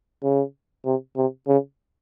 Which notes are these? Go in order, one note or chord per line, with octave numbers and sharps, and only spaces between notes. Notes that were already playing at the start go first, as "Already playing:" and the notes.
C#3
C3
C3
C#3